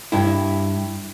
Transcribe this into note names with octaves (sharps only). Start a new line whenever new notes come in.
G2 E4